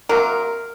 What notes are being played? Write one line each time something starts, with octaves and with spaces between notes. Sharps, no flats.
C3 F#3 A#3 A#4